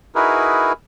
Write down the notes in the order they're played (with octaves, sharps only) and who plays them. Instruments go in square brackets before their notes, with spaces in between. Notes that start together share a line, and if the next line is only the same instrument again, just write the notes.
[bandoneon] D#4 E4 F#4 G#4 A#4 B4